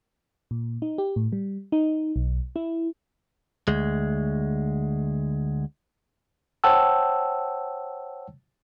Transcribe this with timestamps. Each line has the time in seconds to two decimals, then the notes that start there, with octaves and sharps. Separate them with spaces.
0.51 A#2
0.82 D#4
0.98 G4
1.16 A2
1.32 G3
1.72 D#4
2.16 B1
2.56 E4
3.68 D2 G#3
6.64 C5 C#5 F#5 G5 A5 E6